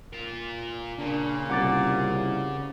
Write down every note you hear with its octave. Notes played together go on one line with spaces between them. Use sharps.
F4 A#4
A#2 C#3 D4
C2 F#5 D6 A6